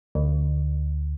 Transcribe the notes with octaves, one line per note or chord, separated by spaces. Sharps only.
D2